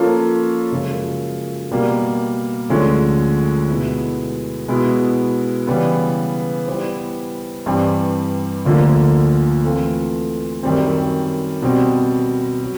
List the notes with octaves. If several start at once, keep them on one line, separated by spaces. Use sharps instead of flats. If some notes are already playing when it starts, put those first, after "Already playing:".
Already playing: F3 A#3 C#4 F4 A4
F#2 C#3 F3 G#3
B2 G3 A#3
D2 D3 F3 G#3 C#4
B2 G#3 B3 E4
B2 G#3 B3 E4
C#3 E3 G3 B3
G3 B3 E4 G4 C5
G2 E3 G3 C4
D2 D3 F3 A#3
E3 A3 C4 F4 A4
F#2 D#3 G3 C4
B2 G3 C4
F#3